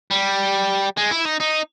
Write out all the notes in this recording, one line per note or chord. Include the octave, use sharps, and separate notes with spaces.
G3
G#3
E4
D#4
D#4